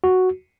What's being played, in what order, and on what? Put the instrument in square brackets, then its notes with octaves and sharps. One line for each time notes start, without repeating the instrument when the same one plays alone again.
[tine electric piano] F#4